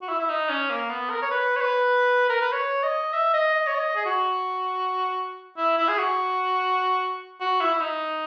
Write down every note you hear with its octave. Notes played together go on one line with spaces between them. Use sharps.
F#4
E4
E4
D#4
C#4
A#3
B3
A#4
C#5
B4
C#5
B4
A#4
B4
C#5
D#5
E5
D#5
D#5
C#5
D#5
G#4
F#4
E4
E4
G#4
F#4
F#4
E4
E4
D#4